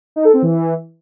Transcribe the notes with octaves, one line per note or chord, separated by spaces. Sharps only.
D#4
A4
C4
E3